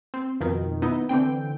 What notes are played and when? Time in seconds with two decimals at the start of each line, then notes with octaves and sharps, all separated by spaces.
0.14 C4
0.41 F2 B2 D#3
0.82 B3 D#4 E4
1.09 D3 E3 C4 G5